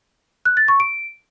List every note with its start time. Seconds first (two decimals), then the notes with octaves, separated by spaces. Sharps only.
0.45 F#6
0.57 A6
0.68 C#6
0.80 D7